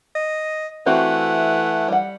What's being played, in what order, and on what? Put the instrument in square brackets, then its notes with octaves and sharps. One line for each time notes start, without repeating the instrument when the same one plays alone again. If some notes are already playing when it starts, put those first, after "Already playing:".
[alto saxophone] D#5
[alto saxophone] E3 [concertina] A3 F#5 [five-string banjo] C4 F#4 G4
[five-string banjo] G3 F#5